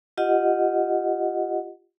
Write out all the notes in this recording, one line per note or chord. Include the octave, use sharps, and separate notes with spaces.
F4 G4 D#5 F#5